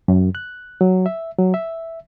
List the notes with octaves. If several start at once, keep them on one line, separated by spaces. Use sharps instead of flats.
F#2
F#6
F#3
E5
F#3
E5